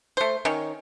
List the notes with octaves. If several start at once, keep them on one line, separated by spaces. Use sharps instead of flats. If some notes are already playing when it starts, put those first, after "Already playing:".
A3 C5
D#3 C#4